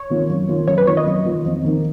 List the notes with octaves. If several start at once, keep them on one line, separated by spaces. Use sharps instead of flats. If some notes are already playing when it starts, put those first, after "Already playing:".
Already playing: C#5
D#3 A#3 F4
F#2
D#3 A#3 F4
F#2 C#5
B4
D#3 A#3 F4 C#5
D#5
F#2
D#3 A#3 F4
F2
D#3 A#3 D#4